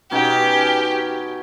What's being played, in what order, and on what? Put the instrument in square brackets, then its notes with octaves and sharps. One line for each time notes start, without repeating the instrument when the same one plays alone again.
[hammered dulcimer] B2 C#4 D#4 [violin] G4